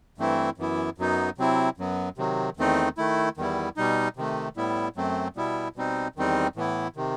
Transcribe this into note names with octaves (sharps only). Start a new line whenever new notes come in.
G2 E3 A3 C4 E4
F#2 E3 B3 E4
F#2 F#3 B3 D#4
C3 F#3 C4 E4
F#2 F#3 B3
C3 D#3 F#3
E2 D#3 A3 C4 D#4
D#3 A3 E4
E2 D#3 G3 B3 E4
B2 G3 D#4
C3 D#3 A3
A2 G3 B3 E4
F#2 F#3 A3 C4
B2 G3 B3 E4
B2 G3 C4 D#4
E2 D#3 G3 C4 D#4
A2 E3 B3 E4
C3 D#3